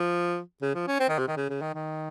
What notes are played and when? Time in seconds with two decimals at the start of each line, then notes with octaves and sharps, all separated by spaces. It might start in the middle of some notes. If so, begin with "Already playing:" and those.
Already playing: F3
0.62 C#3
0.75 F3
0.87 C#4
1.00 C4
1.09 D#3
1.18 C3
1.28 D#3
1.37 C#3
1.50 C#3
1.61 D#3
1.74 D#3